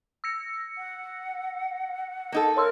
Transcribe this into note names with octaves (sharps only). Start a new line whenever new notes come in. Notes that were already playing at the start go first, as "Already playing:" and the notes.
E6 A#6 C#7
F#5
A#3 D#4 A4
A#4 C#5 C6 E6